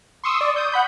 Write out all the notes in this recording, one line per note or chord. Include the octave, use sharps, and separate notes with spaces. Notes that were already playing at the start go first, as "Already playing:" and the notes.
C6 C#6 D#6 E6
D5
D#6 G6
F#5 B5 G6